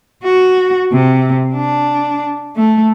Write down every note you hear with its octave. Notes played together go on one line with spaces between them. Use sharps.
F#4
C3
D4
A3